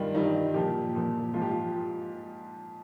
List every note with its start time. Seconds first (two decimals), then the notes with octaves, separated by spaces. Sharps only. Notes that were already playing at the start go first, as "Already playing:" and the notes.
Already playing: G2 D#3 G3 F4
0.14 G2 D#3 G3 D#4
0.54 A#2 F3 G4
0.95 A#2 F3
1.34 G#2 F3 F4
1.42 G4
1.51 F4